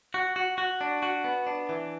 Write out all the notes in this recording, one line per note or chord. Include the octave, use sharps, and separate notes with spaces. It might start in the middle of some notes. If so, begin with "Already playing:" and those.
F#4
F#4
F#4
D4
F#4
B3
D4
E3